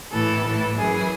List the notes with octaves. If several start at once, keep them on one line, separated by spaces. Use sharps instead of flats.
A2 E3 A4
A2 E3
F#2 E3 G#4